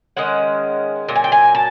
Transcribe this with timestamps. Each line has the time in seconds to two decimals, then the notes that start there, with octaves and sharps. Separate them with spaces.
0.17 D#3 G#3 C#4 F#5
1.08 A#2 F#3
1.16 G#5
1.24 G5
1.32 G#5
1.55 A5